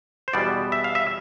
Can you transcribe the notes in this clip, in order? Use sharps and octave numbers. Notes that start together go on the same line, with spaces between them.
C5
E2 B2 G3 B3 D5
E5
F5
E5